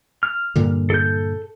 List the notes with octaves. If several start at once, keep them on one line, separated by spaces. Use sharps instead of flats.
F6
G2 A#2 D3
A4 G6